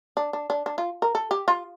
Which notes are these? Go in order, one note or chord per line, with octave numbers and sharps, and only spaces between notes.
D4
D4
D4
D4
F4
A#4
A4
G4
F4